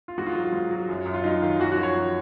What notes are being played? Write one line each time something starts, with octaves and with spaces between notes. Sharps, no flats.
F4
G#2 F#4
F4
F#3
F4
G#2
F#3
F#2
F#2
F4
F#3 D#4
D#3 F4
F#2 F#4
F#4
F3
C#5
F#2